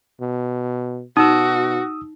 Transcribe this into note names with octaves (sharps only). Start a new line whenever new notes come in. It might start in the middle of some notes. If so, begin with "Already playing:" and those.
B2
B2 D#4 F#4 D#6 E6